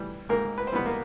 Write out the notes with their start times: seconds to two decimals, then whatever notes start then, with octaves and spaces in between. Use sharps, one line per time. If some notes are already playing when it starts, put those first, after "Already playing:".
Already playing: E3 G3
0.29 G#2 A#3 A#4
0.58 B4
0.67 C5
0.72 E3 G3 B3 B4
0.86 A#3 A#4